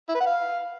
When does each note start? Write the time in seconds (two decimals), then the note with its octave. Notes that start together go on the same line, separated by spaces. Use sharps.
0.09 E4
0.15 B4
0.20 F#5
0.26 F5